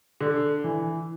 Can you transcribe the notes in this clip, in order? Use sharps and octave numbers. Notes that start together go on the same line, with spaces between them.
D3
E3